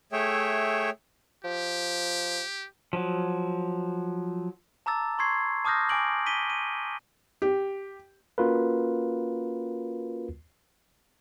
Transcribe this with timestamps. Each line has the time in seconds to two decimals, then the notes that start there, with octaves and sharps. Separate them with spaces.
0.12 A3 G#4 C#5 E5 G5
1.44 F3 G4
2.93 F3 F#3
4.86 A5 A#5 D6 E6 A6
5.19 C6 C#6 G#6 C7
5.65 A5 D6 D#6 F6 G6 A#6
5.89 G#5 D6 D7 F#7
6.26 B6 D#7 G7
6.50 D#7
7.42 G4
8.38 A#3 C#4 F4 F#4 A#4 B4